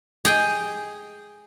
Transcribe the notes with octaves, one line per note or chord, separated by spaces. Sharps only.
G#4 G5 G#5